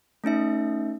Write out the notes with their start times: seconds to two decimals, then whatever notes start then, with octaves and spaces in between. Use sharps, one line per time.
0.24 A3 C#4 D#4 E5